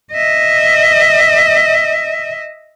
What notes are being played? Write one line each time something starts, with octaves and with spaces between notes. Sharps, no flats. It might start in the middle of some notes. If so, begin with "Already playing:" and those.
D#5 E5